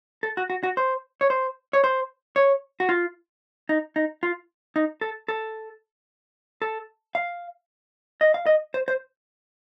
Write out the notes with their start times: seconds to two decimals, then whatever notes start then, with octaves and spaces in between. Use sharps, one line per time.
0.23 A4
0.37 F#4
0.50 F#4
0.63 F#4
0.77 C5
1.21 C#5
1.30 C5
1.73 C#5
1.84 C5
2.36 C#5
2.80 F#4
2.89 F4
3.69 D#4
3.96 D#4
4.23 F4
4.76 D#4
5.01 A4
5.28 A4
6.62 A4
7.15 F5
8.21 D#5
8.34 F5
8.46 D#5
8.74 C5
8.88 C5